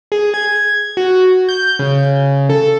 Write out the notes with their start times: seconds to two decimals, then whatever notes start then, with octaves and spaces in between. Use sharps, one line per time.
0.12 G#4
0.34 G#6
0.97 F#4
1.49 G6
1.79 C#3
2.49 A4